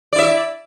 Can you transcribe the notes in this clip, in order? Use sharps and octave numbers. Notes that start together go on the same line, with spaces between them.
E4 D5 E5